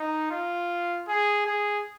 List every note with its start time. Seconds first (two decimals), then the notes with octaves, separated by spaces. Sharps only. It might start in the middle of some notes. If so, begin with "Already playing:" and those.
Already playing: D#4
0.31 F4
1.08 G#4
1.46 G#4